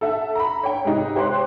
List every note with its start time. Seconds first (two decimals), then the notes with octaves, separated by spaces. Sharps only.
0.01 A4 E5 F#5
0.35 A#5 B5
0.63 C#5 G5
0.85 G#2 C3 D#4
1.15 G4 C5 C#5 G5 C6 F#6